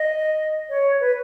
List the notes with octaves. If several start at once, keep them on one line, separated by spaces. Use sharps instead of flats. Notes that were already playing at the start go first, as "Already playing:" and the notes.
Already playing: D#5
C#5
B4